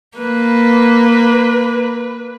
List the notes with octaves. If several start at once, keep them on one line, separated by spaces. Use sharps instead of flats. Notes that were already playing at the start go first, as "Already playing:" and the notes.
A#3 B4